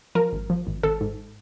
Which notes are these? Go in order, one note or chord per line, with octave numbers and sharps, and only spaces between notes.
F3 A#4
G#1
F3
G#1
G#1 A4
G#2